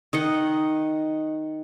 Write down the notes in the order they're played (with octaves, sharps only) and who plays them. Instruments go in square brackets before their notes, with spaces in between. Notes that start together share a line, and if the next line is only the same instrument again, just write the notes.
[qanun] D#3 D#5 F#5